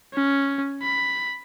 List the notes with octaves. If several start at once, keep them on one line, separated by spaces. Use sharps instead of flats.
C#4
B5